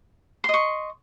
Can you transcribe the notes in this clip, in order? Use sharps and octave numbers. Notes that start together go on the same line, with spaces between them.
D#5 C6 C#6